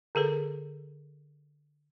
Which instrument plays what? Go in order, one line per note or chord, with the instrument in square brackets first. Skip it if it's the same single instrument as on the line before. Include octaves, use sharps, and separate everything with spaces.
[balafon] D3 G#4 A4 B4